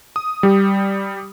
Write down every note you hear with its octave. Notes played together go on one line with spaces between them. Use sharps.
D#6
G3 G4